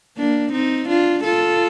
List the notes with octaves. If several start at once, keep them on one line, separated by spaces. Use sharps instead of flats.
A#3 D4
C4 D#4
D4 F4
F4 A4